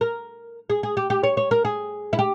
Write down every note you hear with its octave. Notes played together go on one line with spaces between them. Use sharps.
A#4
G#4
G#4
G4
G4
C#5
C#5
A#4
G#4
E4
G4